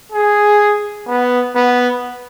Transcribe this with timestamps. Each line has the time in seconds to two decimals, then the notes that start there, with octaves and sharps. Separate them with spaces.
0.12 G#4
1.07 B3
1.55 B3